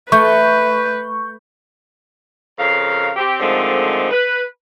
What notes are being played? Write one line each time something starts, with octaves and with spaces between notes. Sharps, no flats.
A3 B4 C#6 G6
F2 C#3 A#4 F5
C4 G4
D3 D#3 F3 G#3 A3 C4
B4